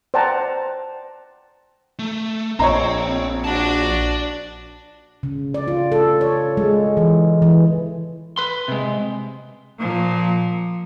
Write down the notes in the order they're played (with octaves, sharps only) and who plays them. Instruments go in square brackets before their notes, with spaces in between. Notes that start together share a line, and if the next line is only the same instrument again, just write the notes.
[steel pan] C5 D5 F#5 G5 A5 A#5
[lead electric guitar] A3
[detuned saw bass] A#1 [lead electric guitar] C4 [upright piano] C#5 D#5 A#5
[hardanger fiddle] D4 F#4 [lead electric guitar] D5 A5
[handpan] C#3
D5
F4
A4
C#5
G#3
E3
E3
[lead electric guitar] B4 C6
C3 G#3
[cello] A#2 F3